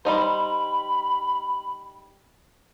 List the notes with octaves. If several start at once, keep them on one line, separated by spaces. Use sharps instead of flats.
G3 D#4 C5 B5